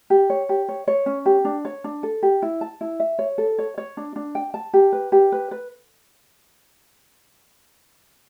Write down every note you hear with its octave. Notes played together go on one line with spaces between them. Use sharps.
G4
C#5
G4
C#5
C#5
C#4
G4
D4
C#5
D4
A4
G4
E4
A5
E4
E5
C#5
A4
C#5
C#5
D4
D4
G5
A5
G4
B4
G4
B4
B4